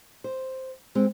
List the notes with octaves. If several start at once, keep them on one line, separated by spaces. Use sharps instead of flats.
C5
G#3 C4